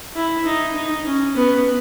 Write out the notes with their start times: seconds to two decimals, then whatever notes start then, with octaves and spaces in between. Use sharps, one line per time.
0.15 E4
0.46 D#4
0.75 D#4
1.06 C#4
1.35 B3